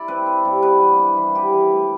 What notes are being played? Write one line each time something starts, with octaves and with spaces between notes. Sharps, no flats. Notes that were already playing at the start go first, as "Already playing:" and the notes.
Already playing: E4 D5
C4 B4
C4
G2
B3 B4
E3
B3
E3
E3 G4
E3
A3